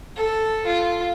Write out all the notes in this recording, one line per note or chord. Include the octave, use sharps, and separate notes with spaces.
A4
F4